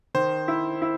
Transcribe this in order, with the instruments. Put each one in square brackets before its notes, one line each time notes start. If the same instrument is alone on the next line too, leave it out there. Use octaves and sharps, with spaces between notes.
[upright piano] D#3 [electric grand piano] C5
[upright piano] E4
E4